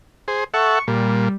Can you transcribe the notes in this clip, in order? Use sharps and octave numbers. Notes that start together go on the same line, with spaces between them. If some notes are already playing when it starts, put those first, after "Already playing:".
G#4 C5
A4 E5 F#5 C#6
A#2 G3